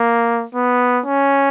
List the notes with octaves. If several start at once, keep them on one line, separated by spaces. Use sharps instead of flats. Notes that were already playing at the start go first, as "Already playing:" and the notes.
Already playing: A#3
B3
C#4